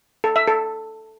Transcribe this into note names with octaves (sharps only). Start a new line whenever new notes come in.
A4
E5
A4